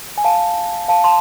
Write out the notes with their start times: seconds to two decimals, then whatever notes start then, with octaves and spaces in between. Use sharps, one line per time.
0.18 G#5
0.24 F5 A5
0.89 F5 A5
1.04 A5 C6